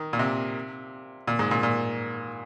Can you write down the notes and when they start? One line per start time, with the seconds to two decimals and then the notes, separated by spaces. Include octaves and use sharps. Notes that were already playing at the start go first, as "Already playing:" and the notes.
Already playing: D#3
0.13 A#2
0.19 C3
1.28 A#2
1.39 G#2
1.51 A#2
1.63 A#2